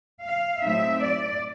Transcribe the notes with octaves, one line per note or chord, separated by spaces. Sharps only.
F5
A2 F#3 A3 C4 D#4 E5
D5